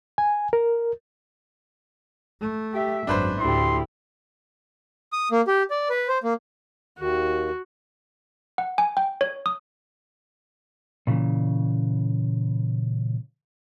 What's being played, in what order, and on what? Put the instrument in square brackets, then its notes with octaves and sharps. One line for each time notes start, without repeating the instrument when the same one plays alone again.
[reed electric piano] G#5
A#4
[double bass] A3
[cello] G4 E5
[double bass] G#1 [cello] F#2 [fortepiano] D4 B4 C5
[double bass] D2 A2 [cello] E4 G4 [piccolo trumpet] C6
[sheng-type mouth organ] D#6
A#3
G4
D5
B4
C5
A#3
[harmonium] D#2 D#3 [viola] F#4
[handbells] F#5
G#5
G5
C#5
D#6
[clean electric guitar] A#2 C#3 E3